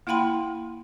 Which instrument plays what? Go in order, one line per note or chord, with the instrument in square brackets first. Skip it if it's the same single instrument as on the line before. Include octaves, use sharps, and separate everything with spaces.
[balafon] A#3 E4 F5 G5 B5 C6